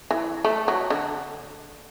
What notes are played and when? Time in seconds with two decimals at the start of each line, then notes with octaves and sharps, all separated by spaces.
0.11 E3
0.45 A3
0.68 F#3
0.90 D3